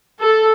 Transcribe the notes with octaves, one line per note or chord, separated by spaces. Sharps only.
A4